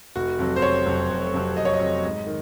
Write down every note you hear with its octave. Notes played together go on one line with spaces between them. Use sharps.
F1 F#4
F2 C3 F#3
C5
F1 C#5
F2 C3 F#3
F1
F2 C3 F#3
F1 D#5
C#5
D#5
F2 C3 F#3
G#2
D#3